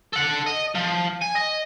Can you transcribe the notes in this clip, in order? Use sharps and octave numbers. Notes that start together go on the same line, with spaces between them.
A4 F#5
D#5
F3
G#5
D#5